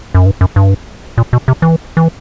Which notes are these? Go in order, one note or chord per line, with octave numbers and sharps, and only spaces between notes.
F#2
G2
F#2
G2
A#2
B2
C3
E3
E3